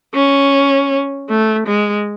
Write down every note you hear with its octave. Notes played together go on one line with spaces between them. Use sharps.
C#4
A3
G#3